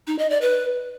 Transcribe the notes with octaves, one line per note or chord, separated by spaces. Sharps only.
D#4
D#5
D5
B4